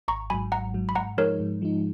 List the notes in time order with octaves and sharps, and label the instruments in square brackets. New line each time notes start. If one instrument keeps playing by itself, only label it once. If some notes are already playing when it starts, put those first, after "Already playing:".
[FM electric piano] G#1 [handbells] A#5 C#6
[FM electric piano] G#2 F#3 [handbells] G#5 B5
[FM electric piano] G#1 [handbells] F#5 A#5
[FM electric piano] G#2 F#3
[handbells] B5
[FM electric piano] G#2 [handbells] F#5 A#5
[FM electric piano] F3 G#3 D#4 [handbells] A#4 C#5
[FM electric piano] G#2
F3 G#3 D#4